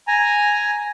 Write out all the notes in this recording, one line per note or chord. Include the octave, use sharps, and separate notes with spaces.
G#5 A#5